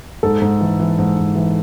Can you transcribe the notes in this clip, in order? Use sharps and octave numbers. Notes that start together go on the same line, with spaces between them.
G#2 A4
G#2
E3
E3
G#2
G#2
E3